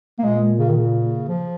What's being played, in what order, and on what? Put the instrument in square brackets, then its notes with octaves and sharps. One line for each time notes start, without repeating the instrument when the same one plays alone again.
[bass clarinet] A#3
[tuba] A#2 [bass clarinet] G#3
[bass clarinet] C#3
D#3
C#3
F3